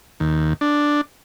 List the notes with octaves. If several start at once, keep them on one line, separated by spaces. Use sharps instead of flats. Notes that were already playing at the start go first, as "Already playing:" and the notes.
D#2
D4